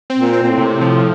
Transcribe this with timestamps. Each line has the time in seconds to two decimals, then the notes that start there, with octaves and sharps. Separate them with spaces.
0.10 C4
0.18 A#2
0.33 C4
0.42 A#2
0.49 A2
0.58 C3
0.81 F3